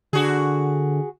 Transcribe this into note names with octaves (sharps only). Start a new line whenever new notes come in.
D3 F#4 G#4